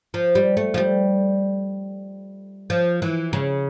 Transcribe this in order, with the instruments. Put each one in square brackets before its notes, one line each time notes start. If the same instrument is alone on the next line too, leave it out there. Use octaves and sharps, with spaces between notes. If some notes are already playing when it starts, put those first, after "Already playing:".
[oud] F3
G3
A3
F3
G3
F3
E3
C#3